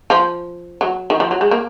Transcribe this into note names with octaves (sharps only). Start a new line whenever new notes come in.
F3
F#3
D#3
F3
F#3
G#3
A#3